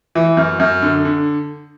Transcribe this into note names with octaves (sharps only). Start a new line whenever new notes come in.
E3
F#2
F#2
D3
D3